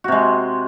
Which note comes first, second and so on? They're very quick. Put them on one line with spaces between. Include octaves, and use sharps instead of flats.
F#4 C3 G#3